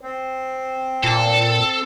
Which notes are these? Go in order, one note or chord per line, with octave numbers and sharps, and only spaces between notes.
C4
A#2 A4